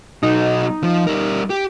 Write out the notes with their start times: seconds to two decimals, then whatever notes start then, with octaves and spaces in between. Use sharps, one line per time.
0.23 B1 D#4 F#4
0.83 F3
1.07 G3 A#4
1.50 G4